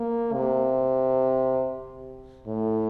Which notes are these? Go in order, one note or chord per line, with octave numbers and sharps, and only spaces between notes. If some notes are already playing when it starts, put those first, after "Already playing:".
Already playing: A#3
C3
A2